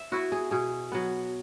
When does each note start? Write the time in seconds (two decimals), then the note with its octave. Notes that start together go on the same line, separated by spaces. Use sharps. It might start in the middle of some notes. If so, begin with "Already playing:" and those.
Already playing: E5
0.12 B3 E4 F#4
0.32 G#4
0.51 B2 G#4
0.92 F#3 B3